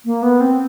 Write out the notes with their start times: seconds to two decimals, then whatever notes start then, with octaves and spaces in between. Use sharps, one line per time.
0.05 A#3
0.23 B3
0.41 C4